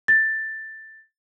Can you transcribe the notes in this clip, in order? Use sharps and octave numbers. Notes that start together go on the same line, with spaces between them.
A6